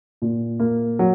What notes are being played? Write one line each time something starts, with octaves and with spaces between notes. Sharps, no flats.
A#2
A#3
F#3